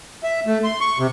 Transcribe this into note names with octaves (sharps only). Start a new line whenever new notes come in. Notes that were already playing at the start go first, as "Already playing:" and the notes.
E5
A3
C6
C#6
C3